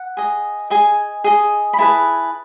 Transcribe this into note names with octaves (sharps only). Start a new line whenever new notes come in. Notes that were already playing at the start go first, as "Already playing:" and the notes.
Already playing: F#5
G#4 D#5
G#4 D#5 G#5
G#4 D#5
B5
E4 G#4 B4 A5